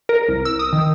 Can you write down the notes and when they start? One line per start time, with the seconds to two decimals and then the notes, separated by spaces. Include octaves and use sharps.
0.09 A#4
0.28 C2
0.45 E6
0.59 D#6
0.73 D#3